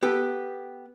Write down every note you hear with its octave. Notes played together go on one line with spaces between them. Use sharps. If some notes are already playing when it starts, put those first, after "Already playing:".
B3 G4 A4